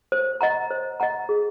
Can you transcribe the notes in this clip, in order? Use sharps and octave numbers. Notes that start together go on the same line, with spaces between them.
C5
D#5 F#5 A#5
C5
D#5 F#5 A#5
G#4